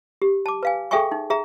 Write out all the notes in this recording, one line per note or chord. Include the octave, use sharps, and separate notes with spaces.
G4
A5 D6
B4 F5 G#5
G#4 A4 E5 G5 G#5 C#6
D#4
G#4 E5 A#5